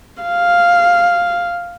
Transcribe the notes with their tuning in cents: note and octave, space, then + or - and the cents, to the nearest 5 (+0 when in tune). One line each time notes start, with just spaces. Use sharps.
F5 +0